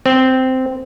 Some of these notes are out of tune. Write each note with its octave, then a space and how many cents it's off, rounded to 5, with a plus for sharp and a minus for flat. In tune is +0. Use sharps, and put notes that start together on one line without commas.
C4 -10